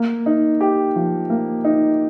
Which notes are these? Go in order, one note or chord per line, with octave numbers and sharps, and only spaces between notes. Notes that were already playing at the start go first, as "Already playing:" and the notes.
Already playing: A#3
D#4
G4
F3
A#3
D#4